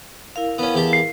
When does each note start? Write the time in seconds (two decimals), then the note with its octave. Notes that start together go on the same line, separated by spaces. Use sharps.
0.36 E4 A#4 F5
0.58 B3 C#4
0.74 E2 G4 A5
0.93 C7